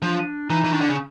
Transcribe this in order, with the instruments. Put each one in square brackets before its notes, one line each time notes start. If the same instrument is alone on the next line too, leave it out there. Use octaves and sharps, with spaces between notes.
[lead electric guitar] F3 [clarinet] D4
[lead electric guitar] E3 [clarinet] D#4
[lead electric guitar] E3
[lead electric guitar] D#3 [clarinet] D4
[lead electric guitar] D3
C#3